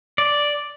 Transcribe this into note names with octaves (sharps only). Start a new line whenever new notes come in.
D5